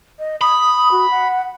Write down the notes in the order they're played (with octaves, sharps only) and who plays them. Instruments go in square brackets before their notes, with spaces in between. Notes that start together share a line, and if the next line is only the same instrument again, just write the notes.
[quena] D#5
[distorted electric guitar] B5 [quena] D#6
[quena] F#4
F#5